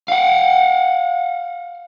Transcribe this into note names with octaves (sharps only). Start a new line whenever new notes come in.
F5 F#5